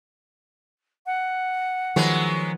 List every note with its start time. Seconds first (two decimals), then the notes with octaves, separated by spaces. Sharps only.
1.06 F#5
1.96 D#3 F3 F#3 G#3 B3